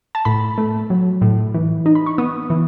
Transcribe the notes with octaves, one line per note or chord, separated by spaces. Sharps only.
A5
A2 B5
A3
F#3
A2
E3
D#4
B5
C#6
B3 D#6
E3